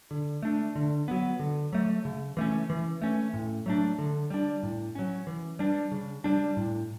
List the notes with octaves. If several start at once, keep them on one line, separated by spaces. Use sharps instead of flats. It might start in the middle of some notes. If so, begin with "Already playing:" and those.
D3
A3 D4
D3
F#3 B3
D3
F#3 A3
C#3
E3 A3 C#4
E3
A3 C#4
A2
F#3 A3 D4
D3
G3 D4
A2
F#3 C#4
E3
G3 D4
C#3
G3 D4
A2